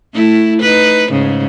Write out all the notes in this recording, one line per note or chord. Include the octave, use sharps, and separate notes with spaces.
A3 E4
D#4 B4
G#2 C#3